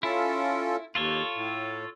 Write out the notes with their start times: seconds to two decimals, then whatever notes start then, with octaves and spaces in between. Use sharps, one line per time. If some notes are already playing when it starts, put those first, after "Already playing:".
0.03 C#4 E4 F4 A4
0.95 D#2 F4 A4 C#5
1.36 A2